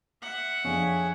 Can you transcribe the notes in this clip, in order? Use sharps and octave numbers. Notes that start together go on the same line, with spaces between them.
E5 F#5
F2 D4 G#4 C#5 F5